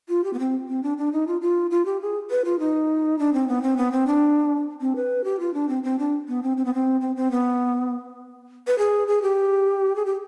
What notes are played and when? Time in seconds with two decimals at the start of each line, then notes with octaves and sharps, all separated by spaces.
0.09 F4
0.24 G4
0.33 B3
0.39 C4
0.69 C4
0.83 D4
0.98 D4
1.12 D#4
1.27 F4
1.41 F4
1.71 F4
1.85 G4
2.01 G#4
2.30 B4
2.45 F4
2.59 D#4
3.19 D4
3.33 C4
3.48 B3
3.62 C4
3.77 B3
3.92 C4
4.07 D4
4.81 C4
4.96 B4
5.24 G4
5.40 F4
5.54 D4
5.69 C4
5.83 C4
5.99 D4
6.28 B3
6.43 C4
6.57 C4
6.65 B3
6.74 C4
7.01 C4
7.16 C4
7.31 B3
8.67 B4
8.78 G#4
9.08 G#4
9.22 G4
9.96 G#4
10.06 G4